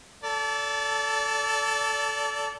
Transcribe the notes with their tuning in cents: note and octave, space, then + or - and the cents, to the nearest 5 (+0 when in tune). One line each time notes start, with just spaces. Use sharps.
A4 +0 D5 -30